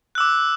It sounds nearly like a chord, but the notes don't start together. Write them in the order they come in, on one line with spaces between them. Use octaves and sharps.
F#6 E6 D6